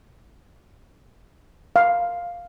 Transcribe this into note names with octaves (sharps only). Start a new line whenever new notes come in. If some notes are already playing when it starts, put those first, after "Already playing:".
F5